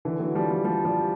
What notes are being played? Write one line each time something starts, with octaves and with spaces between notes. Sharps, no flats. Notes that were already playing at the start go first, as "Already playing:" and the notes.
D3 E3
E3 F#3
F3 G3
F3 G3
F3 G3
F3 G3